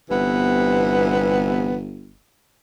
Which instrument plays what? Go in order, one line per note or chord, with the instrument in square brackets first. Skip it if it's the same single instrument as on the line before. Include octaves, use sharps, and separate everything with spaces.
[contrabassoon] G1 [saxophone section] C3 E3 B3